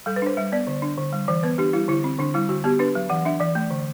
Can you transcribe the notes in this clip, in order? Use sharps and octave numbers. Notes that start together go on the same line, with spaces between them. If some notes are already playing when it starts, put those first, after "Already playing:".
G3 A4
B4
D4 C5
G3 E5
B3 D5
D3
D4
D3
G3
E3 C5
B3 B4
D4 G4
G3 E4
D3 E4
C4
D3 D4
G3 E4
D3 F#4
B3 G4
D4 B4
F#3
E3 F#5
D4 E5
E3 D5
A3
D3